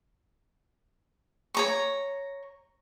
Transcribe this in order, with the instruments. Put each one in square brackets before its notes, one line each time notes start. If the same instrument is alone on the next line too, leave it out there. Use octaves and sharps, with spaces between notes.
[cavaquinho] C#5 A#5 C#6